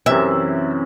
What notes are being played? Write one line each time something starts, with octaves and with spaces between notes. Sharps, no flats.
F#2 C3 E3 E5